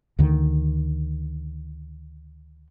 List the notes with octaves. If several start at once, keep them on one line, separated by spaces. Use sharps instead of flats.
D2 D3 D#3